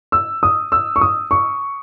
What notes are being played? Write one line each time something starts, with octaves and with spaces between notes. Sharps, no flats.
E6
D#6
E6
C#6
D#6
C#6